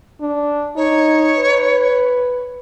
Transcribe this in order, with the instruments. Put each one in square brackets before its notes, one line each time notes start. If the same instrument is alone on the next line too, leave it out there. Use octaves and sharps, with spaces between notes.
[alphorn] D4
[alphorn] D#4 [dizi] C#5
[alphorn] B4